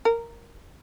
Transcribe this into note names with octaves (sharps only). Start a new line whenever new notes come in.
A#4